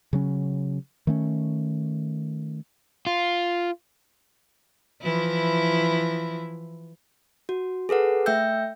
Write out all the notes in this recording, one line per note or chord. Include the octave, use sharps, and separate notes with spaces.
C#3 F#3 C#4
D#3 A3 C#4
F4
E3 F3 E4
F#4
G#4 A4 B4 F#5
A3 E5 G5 E6 G6